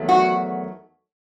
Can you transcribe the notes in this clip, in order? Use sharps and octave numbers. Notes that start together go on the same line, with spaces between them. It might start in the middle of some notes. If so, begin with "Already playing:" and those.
Already playing: E2 D#3 F#3 A3
F#4